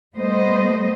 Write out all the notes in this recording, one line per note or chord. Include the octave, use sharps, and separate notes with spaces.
G3 A3 B3 C5 D#5